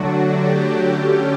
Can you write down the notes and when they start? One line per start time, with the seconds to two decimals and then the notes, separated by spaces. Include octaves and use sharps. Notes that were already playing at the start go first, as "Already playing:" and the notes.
Already playing: D3 F#3 A3 D4 F#4
0.29 G4
0.59 G4
0.90 D3 A3 C#4 G4